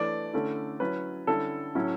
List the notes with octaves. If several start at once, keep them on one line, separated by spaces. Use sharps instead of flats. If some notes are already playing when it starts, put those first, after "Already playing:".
Already playing: E3 A3 D4 D5
D3 A3 C#4 E4
F#3 C#4 E4 B4
D3 G3 C#4 E4 A4
A2 F#3 C#4 E4